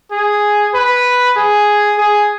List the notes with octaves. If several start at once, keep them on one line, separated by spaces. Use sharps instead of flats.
G#4
B4
G#4
G#4